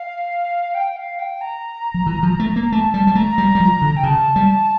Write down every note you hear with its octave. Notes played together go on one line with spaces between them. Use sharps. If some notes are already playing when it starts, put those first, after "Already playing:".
Already playing: F5
G5
F5
G5
A#5
F3
E3
F3
A3
A#3
A3 A5
G3 A5
G3
A3 A#5
G3
G3
F3
D3
G5
C#3 A5
G3